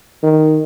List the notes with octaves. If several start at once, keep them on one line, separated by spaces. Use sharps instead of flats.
D#3